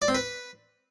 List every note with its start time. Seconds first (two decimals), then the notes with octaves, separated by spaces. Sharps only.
0.02 D5
0.08 C4
0.15 B4